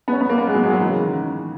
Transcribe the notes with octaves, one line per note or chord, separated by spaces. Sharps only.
B3
C#4
B3
A#3
B3
G#3
F#3
G#3
F#3
E3
C#3
D#3